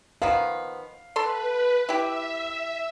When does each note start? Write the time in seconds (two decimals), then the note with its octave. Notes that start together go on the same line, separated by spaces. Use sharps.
0.22 D#3 F3 B3 F5
1.16 A4 B4 C6
1.89 E4 G4 E5